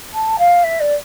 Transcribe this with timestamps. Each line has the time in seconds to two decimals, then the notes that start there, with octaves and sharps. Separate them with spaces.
0.14 A5
0.39 F5
0.64 E5
0.80 D5